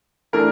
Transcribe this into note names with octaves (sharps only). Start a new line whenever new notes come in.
E3 A3 D4 A#4